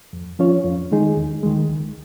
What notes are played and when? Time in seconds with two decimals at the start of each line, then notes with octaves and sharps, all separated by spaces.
0.13 F2
0.39 F3 C#4 F4 C#5
0.65 F2
0.91 D#3 G#3 D#4 G#4
1.17 D#2
1.43 D#3 G#3
1.69 C#2